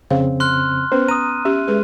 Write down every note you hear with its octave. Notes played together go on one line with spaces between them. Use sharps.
F2 C#3 C4 F5
C6 F6 F#6
B3 C#4 B4 C5
A#5 D#6 D#7
C#4 G4 E5
G#3 G#4 B4